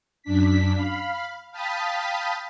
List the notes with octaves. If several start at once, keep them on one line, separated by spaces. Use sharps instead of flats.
F#2 D4 B6
F5 B5
F5 G5 A5 B5 D#6 B6